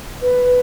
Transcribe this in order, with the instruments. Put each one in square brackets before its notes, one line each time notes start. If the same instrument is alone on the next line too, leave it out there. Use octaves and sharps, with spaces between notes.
[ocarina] B4